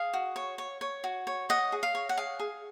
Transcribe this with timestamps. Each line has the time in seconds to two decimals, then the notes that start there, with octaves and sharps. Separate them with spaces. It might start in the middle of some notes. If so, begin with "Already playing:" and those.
Already playing: G#4 F5
0.14 F#4
0.36 C#5
0.58 C#5
0.81 C#5
1.04 F#4
1.27 C#5
1.49 C#5 D#5 F#5
1.72 G#4
1.83 F5
1.95 C#5
2.09 F#5
2.17 G#4 F5
2.40 G#4